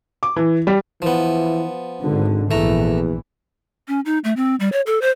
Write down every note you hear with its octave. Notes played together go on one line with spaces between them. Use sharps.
D6
E3
G3
E3 F3 B3
G#1 G#2 D3
A#1 E2 E3 A3 A#5
C#4
D#4
A3
C4
G3
C#5
A4
C5